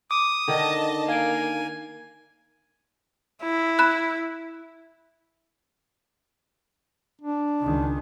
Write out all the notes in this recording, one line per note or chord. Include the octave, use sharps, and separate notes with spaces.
D6 D#6
D3 D#3 D#5 A5
A#3 F5 G#5 D7
E4
B5 F#6
D4
C#2 D#3